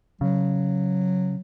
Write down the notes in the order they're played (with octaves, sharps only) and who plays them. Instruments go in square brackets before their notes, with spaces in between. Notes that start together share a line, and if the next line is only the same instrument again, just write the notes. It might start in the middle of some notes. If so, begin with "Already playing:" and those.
[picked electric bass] C#3 [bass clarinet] F#3